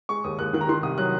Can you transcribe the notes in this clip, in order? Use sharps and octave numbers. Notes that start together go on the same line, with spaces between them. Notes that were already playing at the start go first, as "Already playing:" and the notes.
G#3 C#6
D#2 D#6
D#2 F#6
D#3 F#6
A#5
D#3 C6
C2 D#6
F#3 F#6